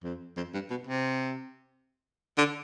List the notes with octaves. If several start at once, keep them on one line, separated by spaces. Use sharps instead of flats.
F2
F2
G2
B2
C3
D3